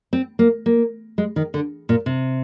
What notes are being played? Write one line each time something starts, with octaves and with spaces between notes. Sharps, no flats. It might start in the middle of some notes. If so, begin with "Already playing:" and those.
C4
A#3
A#3
G#3
D#3
D3
A#2
C3